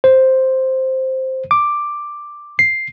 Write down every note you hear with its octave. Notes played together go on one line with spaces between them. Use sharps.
C5
D6
C7